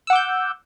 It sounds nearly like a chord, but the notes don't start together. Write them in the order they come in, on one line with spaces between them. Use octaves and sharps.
E6 F#5 D6 G6